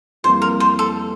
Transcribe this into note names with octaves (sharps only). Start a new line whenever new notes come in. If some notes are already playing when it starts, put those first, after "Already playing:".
F2 E3 G3 A#3 C5
A#4
C5
A4